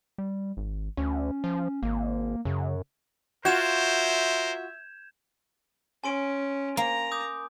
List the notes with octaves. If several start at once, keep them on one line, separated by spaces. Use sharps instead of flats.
G3
G#1
D2 C#4
F3
G#1 A#3
F#2 C#3
F4 F#4 A#4 C5 E5 G6 G#6 E7
C#4 G#5 C6 D7
A#3 A#5
D6 D#6 G6